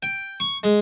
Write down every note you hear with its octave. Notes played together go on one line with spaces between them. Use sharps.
G5
C#6
G#3